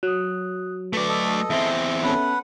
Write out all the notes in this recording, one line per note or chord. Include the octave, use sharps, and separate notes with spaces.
F#3 D#6 F#6
A3 B4 D5
A4 D#5
E2 C4 E5 G7
B3 C#4 A4 B4 F#5